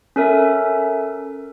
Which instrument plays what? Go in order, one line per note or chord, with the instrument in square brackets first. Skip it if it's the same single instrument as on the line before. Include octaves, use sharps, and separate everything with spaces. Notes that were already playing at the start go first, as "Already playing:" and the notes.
[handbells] C#4 A4 A#4 E5